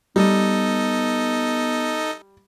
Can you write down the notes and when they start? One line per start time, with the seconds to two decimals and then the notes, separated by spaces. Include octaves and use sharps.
0.16 G3 B3 D#4 A4 D#5